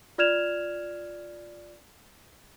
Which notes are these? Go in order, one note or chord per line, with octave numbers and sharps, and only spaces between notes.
F4 D5 F6 G#6 E7 F7